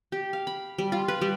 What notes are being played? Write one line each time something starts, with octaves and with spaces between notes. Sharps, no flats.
G4
F5
B5
G3
F4
B4
G3